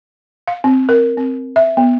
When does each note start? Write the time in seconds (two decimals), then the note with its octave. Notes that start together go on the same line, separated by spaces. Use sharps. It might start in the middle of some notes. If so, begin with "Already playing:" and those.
0.48 F5
0.64 C4
0.89 A#4
1.17 C4
1.56 E5
1.77 B3